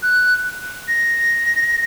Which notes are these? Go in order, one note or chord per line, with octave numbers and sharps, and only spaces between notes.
F#6
A#6